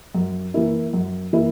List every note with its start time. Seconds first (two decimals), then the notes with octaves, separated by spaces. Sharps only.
0.15 F#2
0.54 E3 A#3 E4
0.93 F#2
1.33 E3 A#3 E4